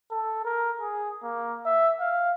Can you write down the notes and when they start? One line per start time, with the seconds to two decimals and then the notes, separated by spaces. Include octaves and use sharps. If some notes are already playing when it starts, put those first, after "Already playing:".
0.11 A4
0.45 A#4
0.81 G#4
1.23 A#3
1.66 E5
2.00 F5